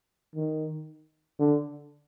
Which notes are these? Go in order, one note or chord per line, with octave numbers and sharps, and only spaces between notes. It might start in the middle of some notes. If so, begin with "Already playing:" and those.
D#3
D3